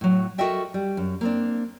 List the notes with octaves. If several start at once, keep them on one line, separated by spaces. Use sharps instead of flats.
A2 F#3
F#4 A4 A#4 D#5 E5 G5
G3
F#2
A#3 C4 D4